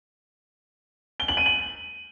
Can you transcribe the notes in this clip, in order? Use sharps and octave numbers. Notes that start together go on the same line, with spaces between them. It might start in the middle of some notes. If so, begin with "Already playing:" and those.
G7
F#7
D#7
F#7